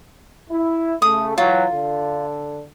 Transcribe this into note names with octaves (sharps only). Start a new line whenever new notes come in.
E4
C#3 A3 D#6
E3 F#3 F4
D3